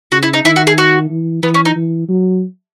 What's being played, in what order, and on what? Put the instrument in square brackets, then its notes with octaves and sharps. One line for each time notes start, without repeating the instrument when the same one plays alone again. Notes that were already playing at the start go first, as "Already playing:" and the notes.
[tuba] C#3 [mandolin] F#4
[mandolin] E4
D#4
[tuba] D#3 [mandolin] E4
[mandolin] F#4
G#4
F#4
[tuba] E3
[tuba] E3 [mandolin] B3
[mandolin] C#4
D#4
[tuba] E3
F#3